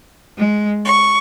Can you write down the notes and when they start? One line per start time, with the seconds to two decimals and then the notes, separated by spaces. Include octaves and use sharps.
0.38 G#3
0.84 C#6